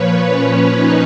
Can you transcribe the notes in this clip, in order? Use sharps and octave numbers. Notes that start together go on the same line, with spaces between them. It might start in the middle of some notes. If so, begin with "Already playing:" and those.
Already playing: A#2 F3 B4 C#5
C#4
D#4